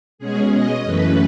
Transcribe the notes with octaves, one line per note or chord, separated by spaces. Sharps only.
B2 G#3 C#4 G#4
D#5
F#2 E3 A3 C#4 B4